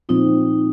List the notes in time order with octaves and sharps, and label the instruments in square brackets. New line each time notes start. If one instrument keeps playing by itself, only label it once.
[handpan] A#2 F3 G#3 C4 F4 [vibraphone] D#4